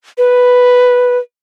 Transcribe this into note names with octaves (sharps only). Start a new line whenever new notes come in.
B4